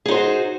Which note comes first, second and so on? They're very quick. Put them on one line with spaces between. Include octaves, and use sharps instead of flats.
G#4 D#4 C5 F#4